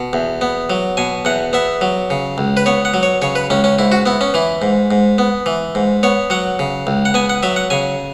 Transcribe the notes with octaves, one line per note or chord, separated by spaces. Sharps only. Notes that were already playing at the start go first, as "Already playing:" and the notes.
Already playing: B2
E2
B3
F#3
B2 G#5
E2 F#5
B3 E5
F#3
C#3
C#2
B4
B3 C#5
F#5
F#3
C#5
C#3 C#5
B4
C#2 C#4
C#4
G#2 E4
F#4
B3 E4
C#4
E3 E4
G#2
G#2
B3
E3
G#2
B3 C#5
F#3 F#5
C#3
C#2
F#5
B3 G#5
F#5
F#3 E5
F#5
C#3 G#5